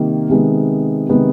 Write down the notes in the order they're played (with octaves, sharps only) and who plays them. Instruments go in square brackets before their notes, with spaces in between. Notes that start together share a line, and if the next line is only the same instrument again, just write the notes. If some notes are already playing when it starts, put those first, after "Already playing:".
Already playing: [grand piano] C3 D#3 G3 A#3
C3 D#3 G#3 B3
C3 D#3 G#3 B3